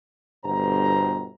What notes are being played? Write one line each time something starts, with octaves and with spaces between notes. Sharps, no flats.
G1 G2 B2 D3 C5 A#5